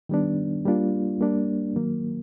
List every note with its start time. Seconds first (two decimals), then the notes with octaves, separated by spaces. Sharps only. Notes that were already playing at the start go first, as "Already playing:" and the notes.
0.09 D#3 G3 B3 D4
0.66 G3 A#3 D4 F4
1.21 G3 A#3 D4
1.76 D#3 F#3 A#3